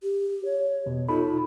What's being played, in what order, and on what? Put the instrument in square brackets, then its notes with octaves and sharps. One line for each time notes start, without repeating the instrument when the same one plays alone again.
[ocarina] G4
C#5
[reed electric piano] E2 B2
[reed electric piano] D#4 A4 B5 [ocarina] F4